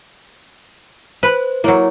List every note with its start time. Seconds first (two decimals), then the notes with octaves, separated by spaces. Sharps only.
1.23 B4 C5
1.64 F#3 A#3 E4 C#5